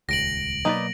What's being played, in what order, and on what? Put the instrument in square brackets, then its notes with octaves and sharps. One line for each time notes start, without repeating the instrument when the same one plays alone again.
[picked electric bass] D#1 C#2 [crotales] A#6 D7 F#7
[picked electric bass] B2 F#3 A#3 [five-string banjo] D#4 B4 D5